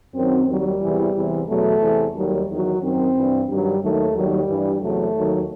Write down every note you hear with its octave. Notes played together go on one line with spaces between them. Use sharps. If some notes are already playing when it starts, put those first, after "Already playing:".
F#2 D#3 F#3 C4
D#2 D#3 F#3 G3
E2 C3 E3
E2 C3 E3
E2 B2 F#3 A3
E2 C3 E3
D#2 D#3 F#3 G3
E2 D#3 F#3
F#2 D#3 F#3 C4
G2 E3
G2 D#3 F#3 G3
D#2 D#3 F#3 A3
D#2 D#3 F#3 G3
G2 E3
E2 C3 F#3 A3
D#2 D#3 F#3